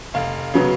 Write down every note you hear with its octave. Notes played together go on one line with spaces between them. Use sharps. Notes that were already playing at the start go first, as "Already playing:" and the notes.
F1 F5
C#3 F#3 B3